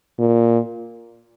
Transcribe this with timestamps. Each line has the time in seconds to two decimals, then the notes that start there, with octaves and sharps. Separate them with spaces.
0.19 A#2